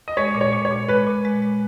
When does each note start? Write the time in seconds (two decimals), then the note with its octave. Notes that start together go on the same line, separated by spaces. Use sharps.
0.08 D#5
0.17 G#3 C#5
0.35 A#2
0.41 C#5
0.53 A#2
0.65 C#5
0.71 A#2
0.88 G#3 B4
1.07 A#2
1.25 G#3
1.42 G#3